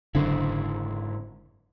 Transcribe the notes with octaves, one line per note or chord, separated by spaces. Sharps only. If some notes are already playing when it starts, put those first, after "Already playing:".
F#1 G#2 D3 C4 E4